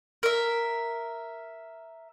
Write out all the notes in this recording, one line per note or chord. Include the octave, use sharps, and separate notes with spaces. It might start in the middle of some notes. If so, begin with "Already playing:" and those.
A#4 E5